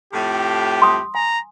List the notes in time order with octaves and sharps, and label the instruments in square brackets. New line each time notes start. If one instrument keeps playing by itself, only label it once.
[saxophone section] F2 A2 [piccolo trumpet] G4
[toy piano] C6 D#6
[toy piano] G#5 [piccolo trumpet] A#5